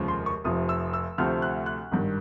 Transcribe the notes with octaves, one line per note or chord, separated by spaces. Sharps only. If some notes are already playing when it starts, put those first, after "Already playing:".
Already playing: F1 D#2 C#3 F3 G#3
C6
C#6
F1 F2 C3 F3 D#6
E6
E6
D2 C3 F3 A3 C4 F6
F#6
F#6
G#1 G2 D#3